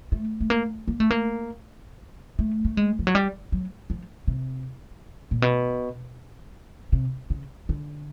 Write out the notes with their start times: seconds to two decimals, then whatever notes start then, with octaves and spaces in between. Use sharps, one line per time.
0.12 A3
0.40 A3
0.50 A#3
0.88 A#3
1.00 A3
1.10 A#3
2.39 A3
2.65 A3
2.77 G#3
2.99 F3
3.07 F#3
3.15 G3
3.52 F#3
3.90 F3
4.28 C3
5.31 A#2
5.42 B2
6.92 C3
7.30 C#3
7.69 D3